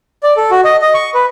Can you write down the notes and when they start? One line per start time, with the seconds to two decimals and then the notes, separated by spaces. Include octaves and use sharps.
0.23 D5
0.37 A4
0.51 F#4
0.64 D#5
0.82 D#5
0.94 C#6
1.15 B4